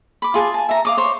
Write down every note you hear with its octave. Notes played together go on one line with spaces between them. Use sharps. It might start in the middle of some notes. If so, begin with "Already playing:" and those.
B5 D6
F4 G#4 A5
G#5 A5
E5 A#5
F5 D6 D#6
C5 C#5